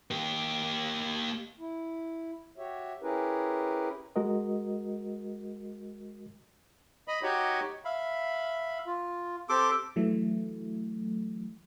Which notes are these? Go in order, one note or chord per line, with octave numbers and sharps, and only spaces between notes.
A#3 G4
E4
F#4 G4 C#5 E5
C#4 E4 G4 G#4 A#4 B4
G#3 F#4 A#4 D#5
D#5 B5
D#4 F#4 G4 C#5
E5 F5 B5
F4
C4 G4 A4 C6 D6
E3 F#3 A3